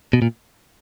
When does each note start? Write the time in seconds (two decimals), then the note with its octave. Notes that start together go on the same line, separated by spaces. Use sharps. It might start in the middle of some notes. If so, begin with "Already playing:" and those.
0.13 B2
0.22 A#2